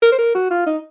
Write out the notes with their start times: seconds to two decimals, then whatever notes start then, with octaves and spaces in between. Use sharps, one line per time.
0.02 A#4
0.12 C5
0.19 A#4
0.35 F#4
0.51 F4
0.67 D#4